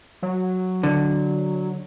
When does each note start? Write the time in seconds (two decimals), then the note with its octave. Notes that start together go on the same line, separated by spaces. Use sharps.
0.22 F#3
0.83 D3